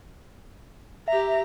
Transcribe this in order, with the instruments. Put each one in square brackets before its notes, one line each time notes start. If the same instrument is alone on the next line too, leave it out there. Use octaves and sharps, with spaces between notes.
[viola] G4 A#5 [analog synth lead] E5